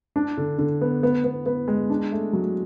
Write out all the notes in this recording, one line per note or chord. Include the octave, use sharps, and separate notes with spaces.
D4
D3
D3
B3
B3
B3
B3
G#3
D4
A3
F#3